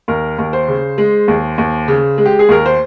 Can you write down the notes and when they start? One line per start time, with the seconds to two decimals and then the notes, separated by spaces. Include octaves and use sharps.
0.08 D#2 A#4
0.38 D#2
0.53 C5
0.68 C#3
0.98 G#3
1.28 D#2
1.58 D#2
1.88 C#3
2.18 G#3
2.25 G4
2.39 G#4
2.49 D#2 A#4
2.66 C5